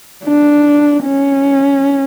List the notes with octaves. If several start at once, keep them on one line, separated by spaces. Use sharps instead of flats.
D4
C#4